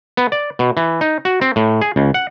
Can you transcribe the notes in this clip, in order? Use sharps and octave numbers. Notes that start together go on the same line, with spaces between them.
B3
D5
B2
E3
D#4
F#4
C4
A2
G#4
C#2
F#5